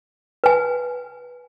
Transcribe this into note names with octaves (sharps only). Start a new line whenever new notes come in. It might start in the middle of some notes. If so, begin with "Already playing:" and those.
B4 G#5